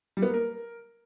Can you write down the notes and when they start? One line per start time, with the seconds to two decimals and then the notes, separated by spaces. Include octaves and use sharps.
0.17 G3
0.22 B3
0.28 A#3
0.34 A#4